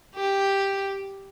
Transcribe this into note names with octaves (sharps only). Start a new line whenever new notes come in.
G4